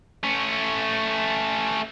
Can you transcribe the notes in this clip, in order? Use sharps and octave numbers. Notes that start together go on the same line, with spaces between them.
A3 C#4